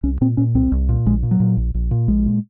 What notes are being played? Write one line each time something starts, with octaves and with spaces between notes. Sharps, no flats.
C2 C#4
A#2 C4
A#2 C#4
C2 C4
C2
A#2
A#1 G#3
A#2
F#3
A#2
A#1
A#1
A#2
A#1 G#3
A#2